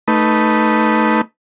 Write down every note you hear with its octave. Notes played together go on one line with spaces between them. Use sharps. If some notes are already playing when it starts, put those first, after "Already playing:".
A3 D#4 B4